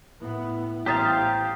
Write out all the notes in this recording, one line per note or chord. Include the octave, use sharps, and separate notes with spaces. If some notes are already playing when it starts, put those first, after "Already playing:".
A2 B3 E4
A1 G4 C5 F5 A#5 D#6 A6